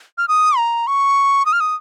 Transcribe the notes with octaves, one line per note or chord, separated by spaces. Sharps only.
F6
D#6
A#5
C#6
D#6
F6
D#6